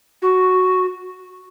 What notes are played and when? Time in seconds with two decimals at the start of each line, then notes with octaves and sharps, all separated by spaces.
0.22 F#4